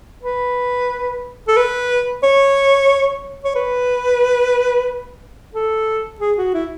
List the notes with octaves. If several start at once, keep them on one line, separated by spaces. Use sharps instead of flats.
B4
A4
B4
C#5
C#5
B4
A4
G#4
F#4
E4